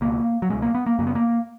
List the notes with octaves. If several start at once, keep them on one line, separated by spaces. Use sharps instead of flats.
C#2 B2 A#3
F#3
C#2 B2 G#3
A#3
B3
A#3
F#2 C#3 A#3
B3
A#3